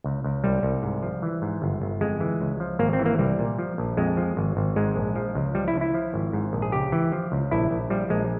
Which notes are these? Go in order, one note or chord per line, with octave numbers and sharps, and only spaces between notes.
C#2
C#2
C2 G3
C2
G#2
F3
E3
G#2
G1
G1
F2 G#3
E3
C#2
F3
G#1 A#3
C4
E3
A#3
C2 G3
A#2
F3
A#1
F2 G#3
F3
G#1
G#1
G#2 G#3
A#1
F3
C#2
F3 G3
E4
C#2
E4
F3
G#1
G#2
A#1
G#4
C#2 G4
E3
F3
C#2
A#1 E4
A#1
F3 G3
A#1 G#3